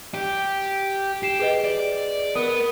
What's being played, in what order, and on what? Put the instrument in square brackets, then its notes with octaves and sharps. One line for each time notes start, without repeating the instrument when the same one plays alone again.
[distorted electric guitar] G4
[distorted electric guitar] G4 [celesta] C7 E7
[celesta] G#4 B4 D#5
[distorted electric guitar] D5
[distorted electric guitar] B3 [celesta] A#4 D#6